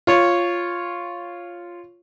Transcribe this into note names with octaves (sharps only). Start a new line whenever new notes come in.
F4 C#5